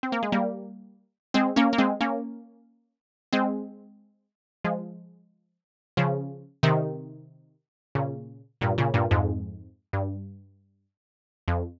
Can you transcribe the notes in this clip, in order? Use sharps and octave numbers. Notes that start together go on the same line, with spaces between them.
C4
A#3
G#3
G3 A#3
G#3 C4
A#3 C#4
A#3
G#3 C4
A#3 C#4
G#3 C4
F3 G#3
C#3 F3
C3 D#3
A#2 C#3
G2 A#2
A#2 C#3
G2 A#2
F2 G#2
G2
F2